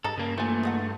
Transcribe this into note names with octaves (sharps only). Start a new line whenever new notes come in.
G2 G#4 A4 D#5 A#5
G2 C#3 A#3
A#2 E3 A3 C4 G#5
G#4 D#5 F#5